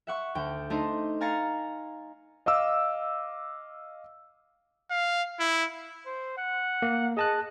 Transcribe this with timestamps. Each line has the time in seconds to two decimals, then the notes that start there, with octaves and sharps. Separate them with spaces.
0.07 E5 F#5 C#6
0.35 D2 G5
0.70 A3 D4 D#4 C5 D#5
1.20 F5 G#5 A#5 A6 C7 C#7
2.46 D#5 F5 D6 E6
4.90 F5
5.40 E4
6.06 C5
6.37 F#5
6.82 A#3
7.17 G#4 D#5 A5 F#6